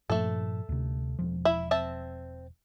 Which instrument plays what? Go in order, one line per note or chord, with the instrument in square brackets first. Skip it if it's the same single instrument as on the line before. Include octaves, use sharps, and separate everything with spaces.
[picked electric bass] G2 A#2 F3 [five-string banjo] A3 A4
[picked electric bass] D2 C3
E1 F3
[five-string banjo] E4 E5 B5
C4 E5 A5